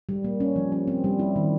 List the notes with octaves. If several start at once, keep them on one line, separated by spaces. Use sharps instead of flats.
G3
A#3
C#4
F3
C#4
C4
G3
E4
D#3